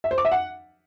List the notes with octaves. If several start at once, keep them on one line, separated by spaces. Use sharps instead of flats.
E5
C5
D6
E5
F#5